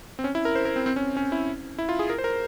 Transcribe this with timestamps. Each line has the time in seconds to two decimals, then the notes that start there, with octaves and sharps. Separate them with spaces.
0.19 C4
0.24 C#4
0.35 E4
0.45 A#4
0.55 C5
0.65 A#4
0.76 C4
0.86 C4
0.96 C#4
1.17 C#4
1.32 E4
1.79 E4
1.89 F4
1.99 G#4
2.10 A#4
2.18 C5
2.24 A#4